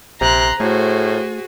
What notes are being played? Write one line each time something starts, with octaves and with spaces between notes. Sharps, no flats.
A#1 C3 A#5 C6 F#6
A2 A3 F#4 G#4 C5